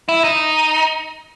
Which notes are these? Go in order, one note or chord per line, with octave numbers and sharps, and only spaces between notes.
E4
D#4